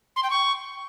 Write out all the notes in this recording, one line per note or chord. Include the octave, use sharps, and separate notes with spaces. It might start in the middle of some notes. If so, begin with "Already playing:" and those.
C6
G5
C#6